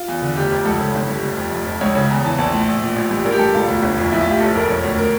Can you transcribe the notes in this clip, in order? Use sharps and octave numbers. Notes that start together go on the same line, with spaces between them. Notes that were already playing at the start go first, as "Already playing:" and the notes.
Already playing: F4
E2
D3
F1 G4
F2
C#2 A4
C#3
G1
G2
F1
F2
F1
F2
C#2 C#5
C#3
E2 A#5
E3 A5
A#1 A5
A2
A#1
A#2
A1
G2
A1 A#4
G4
G2 A4
E1 F4
D2
G1
F2
A#1 E4
F4
A2 G4
F1 A4
F2 A#4
E1 C#5
D2
A#4